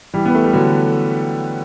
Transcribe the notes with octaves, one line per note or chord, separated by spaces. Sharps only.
E3 G3
B3
A3
G3
D3 F#3